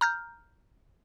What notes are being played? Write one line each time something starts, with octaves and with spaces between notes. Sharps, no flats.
A#5 F6 G6